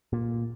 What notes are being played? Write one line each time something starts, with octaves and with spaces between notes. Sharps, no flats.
A#2